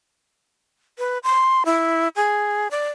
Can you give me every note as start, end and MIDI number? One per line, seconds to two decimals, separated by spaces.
0.98 1.18 71
1.23 1.63 84
1.65 2.08 64
2.16 2.68 68
2.71 2.89 74